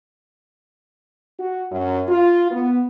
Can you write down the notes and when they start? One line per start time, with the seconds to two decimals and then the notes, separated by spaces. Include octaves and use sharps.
1.39 F#4
1.71 F#2
2.09 F4
2.51 B3